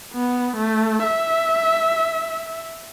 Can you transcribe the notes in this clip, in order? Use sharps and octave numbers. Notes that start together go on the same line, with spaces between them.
B3
A3
E5